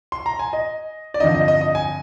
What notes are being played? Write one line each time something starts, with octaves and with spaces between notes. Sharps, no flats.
C6
A#5
G#5
D#5
D5
G2 D3 F3 C4 D#4 D#5
D#5
D#5
D#5
G#5